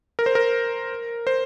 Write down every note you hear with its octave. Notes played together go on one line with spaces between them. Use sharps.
A#4
C5
A#4
C5